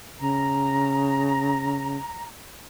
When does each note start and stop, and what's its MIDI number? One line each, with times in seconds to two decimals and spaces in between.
0.20 1.98 49
0.20 2.23 82